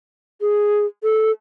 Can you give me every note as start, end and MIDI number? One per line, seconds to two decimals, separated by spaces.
0.41 0.85 68
1.03 1.31 69